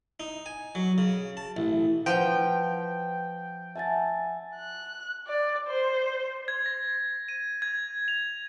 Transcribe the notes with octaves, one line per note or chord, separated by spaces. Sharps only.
D#4
G#5
F#3
C#3
A5
A1
F3 B4 F#5 G5
E5 F#5 G#5 A5 A6
F#6
D5
C5
G#6
A#6
D#7
G#6
F7